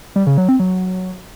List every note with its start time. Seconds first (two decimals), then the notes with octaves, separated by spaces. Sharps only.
0.16 G3
0.27 C#3
0.38 F#3
0.49 C4
0.60 F#3